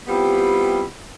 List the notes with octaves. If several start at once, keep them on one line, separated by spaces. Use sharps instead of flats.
G3 B3 C4 E4 F4 G4